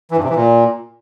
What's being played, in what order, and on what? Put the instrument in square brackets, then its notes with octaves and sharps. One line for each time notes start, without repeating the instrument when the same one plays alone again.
[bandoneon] E3
G2
C3
E3
A#2